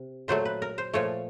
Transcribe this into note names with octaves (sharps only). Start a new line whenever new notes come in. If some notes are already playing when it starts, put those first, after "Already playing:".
Already playing: C3
A#2 F#3 A3 C5
B4
A#4
C5
A#2 F3 A3 C#5